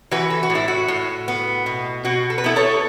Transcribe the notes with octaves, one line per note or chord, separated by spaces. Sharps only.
E3 F#4 B4
A4
F#4
A2
E4
F#4
A2
B3
B2
B2 F#4
A4
B4
B3 E4 A4
A4 C#5